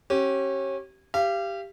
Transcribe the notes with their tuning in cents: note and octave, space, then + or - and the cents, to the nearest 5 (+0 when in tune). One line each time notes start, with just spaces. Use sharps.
C#4 -30 G4 -30
G4 +5 F5 -35